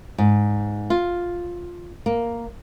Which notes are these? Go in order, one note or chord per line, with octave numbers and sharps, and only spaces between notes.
G#2
F4
A#3